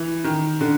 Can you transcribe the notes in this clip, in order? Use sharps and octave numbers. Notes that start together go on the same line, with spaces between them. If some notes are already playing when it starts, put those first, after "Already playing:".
Already playing: E3
D#3
D3